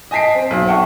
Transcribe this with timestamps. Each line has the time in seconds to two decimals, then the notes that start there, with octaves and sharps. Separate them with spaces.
0.11 D#5 G#5 A5 B6 C7 D7
0.34 C4
0.51 B1
0.67 E5 F#5 G5 A5 C#6